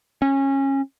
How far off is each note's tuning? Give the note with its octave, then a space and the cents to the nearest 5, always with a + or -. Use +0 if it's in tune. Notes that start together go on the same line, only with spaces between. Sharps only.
C#4 -20